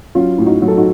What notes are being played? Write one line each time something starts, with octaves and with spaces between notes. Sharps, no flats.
F#3 C#4 F4
A2
D#4 F#4
F#3
A4
D#4 F#4